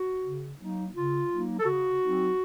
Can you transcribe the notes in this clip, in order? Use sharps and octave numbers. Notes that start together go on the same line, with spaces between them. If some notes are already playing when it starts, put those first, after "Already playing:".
Already playing: F#4
C#3
F#3 A#3 D#4
C#3 F4
F#3 A#3 D#4
A4
C#3 F#4
F#3 C4 D#4